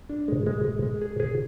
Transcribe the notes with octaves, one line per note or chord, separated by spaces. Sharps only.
D4
G#3
G#3
G#3
G#3
G#4
G#4